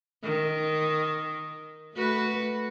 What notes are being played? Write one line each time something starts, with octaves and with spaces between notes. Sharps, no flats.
D#3
A3 F#4 B4